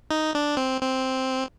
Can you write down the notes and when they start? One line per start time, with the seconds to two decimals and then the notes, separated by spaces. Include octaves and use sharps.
0.11 D#4
0.35 D4
0.57 C4
0.81 C4